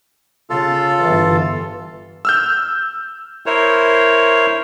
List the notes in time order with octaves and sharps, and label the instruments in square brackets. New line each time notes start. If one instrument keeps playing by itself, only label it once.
[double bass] C#3 [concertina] F4 A4
[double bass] G1 E3
[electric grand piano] E6 F6 G6
[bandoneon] E4 A#4 C5 C#5